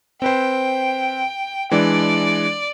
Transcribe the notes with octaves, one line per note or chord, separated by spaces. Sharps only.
C4 B4 C5 G5
E3 G#3 D4 D5